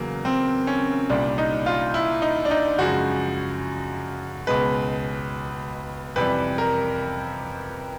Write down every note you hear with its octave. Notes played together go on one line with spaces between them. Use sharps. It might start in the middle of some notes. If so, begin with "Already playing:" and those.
Already playing: E2 C#3 F#3 A#3
C4
C#4
C2 A#2 G3 D4
D#4
F4
E4
D#4
D4
D#4
F#2 C#3 F3 G#3 F#4
C#2 B2 G#3 B4
F2 C3 E3 G3 B4
A#4